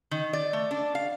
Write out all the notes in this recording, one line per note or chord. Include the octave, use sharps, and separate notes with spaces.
D#3
D5
A3
D4
F5